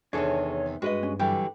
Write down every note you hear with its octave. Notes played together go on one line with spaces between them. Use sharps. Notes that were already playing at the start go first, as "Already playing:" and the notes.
E2 C3 D#3 D4 G#4 A4 C#5
G2 G#3 F#4 B4 D#5
C#4
D3 E3 F#3 G3 E4 G4